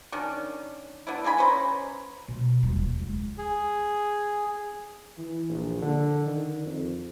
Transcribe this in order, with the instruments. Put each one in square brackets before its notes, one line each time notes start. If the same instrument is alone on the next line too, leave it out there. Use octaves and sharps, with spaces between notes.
[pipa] D#3 C#4 D4
B3 D4 E4
G#3 D5 G#5 B5
C#4 B4 C5 A#5
[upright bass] B2
D#1
F3
C#2
[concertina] G#4
[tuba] E3
A#1
D3
D#3
F2